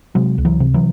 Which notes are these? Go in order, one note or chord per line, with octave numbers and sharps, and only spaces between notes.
C3 F#3 G#3
C#2
E3 F#3
C3
E3 F#3